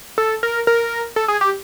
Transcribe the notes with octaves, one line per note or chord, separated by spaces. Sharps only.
A4
A#4
A#4
A4
G#4
G4